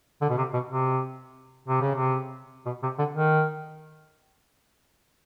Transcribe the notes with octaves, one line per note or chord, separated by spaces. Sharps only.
D3
B2
C3
B2
C3
C3
C#3
C3
B2
C3
D3
D#3